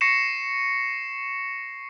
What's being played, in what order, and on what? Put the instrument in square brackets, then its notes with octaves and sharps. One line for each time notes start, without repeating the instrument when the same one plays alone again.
[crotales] C#6 A#6 C7 C#7 E7